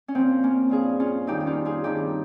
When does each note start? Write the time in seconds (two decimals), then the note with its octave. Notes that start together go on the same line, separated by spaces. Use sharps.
0.08 C#4
0.15 A#2 F3 C4
0.43 A#3 C#4
0.70 G2 F3 F4 G#4
1.00 C#4 F4
1.27 F2 D#3 G3 D#4 G4
1.40 G4
1.46 C#4 F4
1.65 F4 G#4
1.84 G2 D#3 G3 D#4 G4